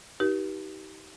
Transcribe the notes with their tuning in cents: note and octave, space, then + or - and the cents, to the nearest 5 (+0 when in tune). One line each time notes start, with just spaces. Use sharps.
D#4 +25 G4 -25 B4 -45